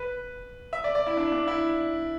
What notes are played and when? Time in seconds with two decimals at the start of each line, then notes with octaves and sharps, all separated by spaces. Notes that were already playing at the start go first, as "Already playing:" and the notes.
Already playing: B4
0.73 E5
0.84 D5
0.95 D5
1.07 E4
1.17 D4
1.32 D4
1.47 E4